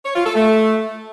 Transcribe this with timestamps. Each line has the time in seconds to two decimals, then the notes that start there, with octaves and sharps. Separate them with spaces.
0.06 C#5
0.16 F4
0.25 A4
0.35 A3